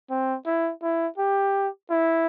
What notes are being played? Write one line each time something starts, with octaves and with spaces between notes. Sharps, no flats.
C4
E4
E4
G4
E4